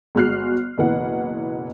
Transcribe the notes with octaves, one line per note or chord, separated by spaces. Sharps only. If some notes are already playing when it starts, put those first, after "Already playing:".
G1 G#3 F#4 F6 F#6 C7
F#1 B1 E3 B3 F#5